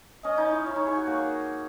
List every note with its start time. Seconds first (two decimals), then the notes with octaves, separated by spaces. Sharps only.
0.24 C#4 D#5
0.38 D#4
0.51 E4
0.66 E4 C#5
0.76 D#4
0.87 G#4
0.97 F#4
1.07 A#3